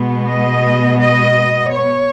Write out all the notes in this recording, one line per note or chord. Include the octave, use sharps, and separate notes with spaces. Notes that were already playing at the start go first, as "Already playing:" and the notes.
Already playing: B2 G#3 B3
D#5
D#5
C#5